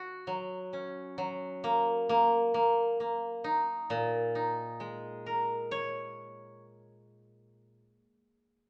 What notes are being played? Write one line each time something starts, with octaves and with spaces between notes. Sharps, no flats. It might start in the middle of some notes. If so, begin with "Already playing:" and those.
Already playing: F#4
F#3
C#4
F#3
A#3
A#3
A#3
A#3
D#4
A#2
D#4
G#3
A#4
C#5